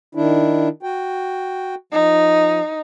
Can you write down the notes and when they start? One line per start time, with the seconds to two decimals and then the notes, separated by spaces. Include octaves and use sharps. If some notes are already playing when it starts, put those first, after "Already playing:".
0.15 D#3 D4 E4
0.83 F#4 G5
1.93 F3 D#4